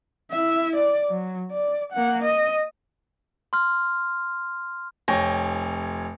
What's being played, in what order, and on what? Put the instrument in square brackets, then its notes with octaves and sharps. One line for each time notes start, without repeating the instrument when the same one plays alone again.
[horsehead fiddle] E4 E5
D5
F#3
D5
A#3 F#5
D#5
[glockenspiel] C6 F6
[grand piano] F1 C#5 G5 G#5 A#6